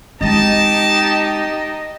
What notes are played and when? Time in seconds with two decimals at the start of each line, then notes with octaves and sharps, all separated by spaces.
0.21 G#3 C4 D#4 G4 D#5 A5